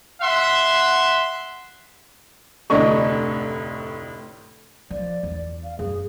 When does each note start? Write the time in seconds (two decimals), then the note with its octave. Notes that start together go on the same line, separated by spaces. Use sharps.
0.21 E5 F#5 C6
2.70 F1 D2 A2 D4 D#5 C#6
4.90 F3 D5
5.23 E2
5.63 F5
5.79 F#2 G#4